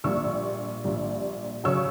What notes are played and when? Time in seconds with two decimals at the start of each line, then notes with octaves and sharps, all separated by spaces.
0.04 A#1 A#2 G3 C#6 E6
0.84 A#1 A#2 G3
1.64 C#3 F#3 C#6 E6